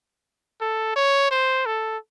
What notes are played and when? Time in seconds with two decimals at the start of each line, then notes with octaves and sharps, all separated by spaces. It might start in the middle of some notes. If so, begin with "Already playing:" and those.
0.61 A4
0.96 C#5
1.31 C5
1.66 A4